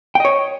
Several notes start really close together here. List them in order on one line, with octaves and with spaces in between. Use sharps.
G5 D#5 C#5